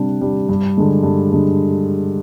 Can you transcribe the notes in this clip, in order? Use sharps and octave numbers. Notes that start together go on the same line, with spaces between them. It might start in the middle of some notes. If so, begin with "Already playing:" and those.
Already playing: C3 G3 D4
G3 D4
G2
D3 G#3 D4
G2
D3 G#3 D4